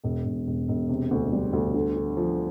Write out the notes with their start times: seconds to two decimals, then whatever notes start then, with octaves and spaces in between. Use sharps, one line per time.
0.04 E1
0.25 E1
0.47 E1
0.68 E1
0.89 C3
1.11 D2
1.33 G3
1.53 D2
1.74 D3
1.96 D3
2.17 F3